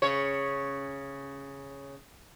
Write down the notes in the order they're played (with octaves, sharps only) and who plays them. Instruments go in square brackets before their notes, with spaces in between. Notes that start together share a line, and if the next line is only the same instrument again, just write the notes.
[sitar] C#3 C#5